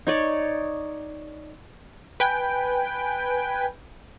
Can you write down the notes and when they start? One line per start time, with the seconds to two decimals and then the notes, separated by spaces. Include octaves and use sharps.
0.07 D#4 C#5 D5
2.20 B4 G5 G#5